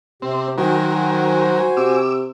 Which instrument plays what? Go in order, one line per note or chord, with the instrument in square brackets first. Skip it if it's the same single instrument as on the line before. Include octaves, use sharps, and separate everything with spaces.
[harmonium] C3 G4 [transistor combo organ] C4
[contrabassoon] D#3 [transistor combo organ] F#3 A#4 [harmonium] F#4 C5 G#5
[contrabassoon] C3 [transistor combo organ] D6 E6